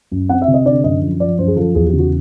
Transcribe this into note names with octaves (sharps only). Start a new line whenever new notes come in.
F#2
C4 F#5
E5
C3
D#5
D3 D5
F#2 D#5
F3
F3 D5
F#2 C5
G#4
F3 A4
E2 G#4
G4
C#3
F#4